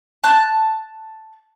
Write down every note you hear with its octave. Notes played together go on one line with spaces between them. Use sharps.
A5 F#6